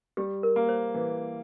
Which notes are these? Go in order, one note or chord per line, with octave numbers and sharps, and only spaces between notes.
G3 G4
A#4
A#3
C5
E3